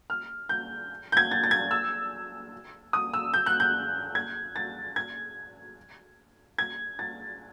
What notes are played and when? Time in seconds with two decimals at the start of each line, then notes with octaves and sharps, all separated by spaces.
0.10 F6
0.49 G6
1.12 G6
1.17 G#6
1.31 A6
1.43 A6
1.51 G#6
1.71 E6
2.93 D#6
3.14 E6
3.34 G6
3.46 F#6
3.60 G6
4.15 G#6
4.56 A6
4.96 G#6
6.58 G#6
6.99 A6